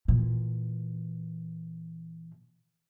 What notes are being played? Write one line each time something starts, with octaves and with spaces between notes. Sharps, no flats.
A#2 E3